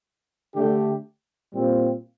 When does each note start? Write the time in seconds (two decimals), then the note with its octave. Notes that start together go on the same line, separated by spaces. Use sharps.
0.54 D3 A3 D4 G4
1.52 A#2 G3 C4 F4